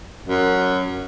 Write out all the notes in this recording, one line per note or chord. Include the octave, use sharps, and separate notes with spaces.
F#2